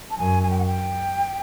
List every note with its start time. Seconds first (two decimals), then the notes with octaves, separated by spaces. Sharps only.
0.11 A5
0.18 F#2 G#5
0.43 G#5
0.51 G5
0.59 F#5
0.66 G5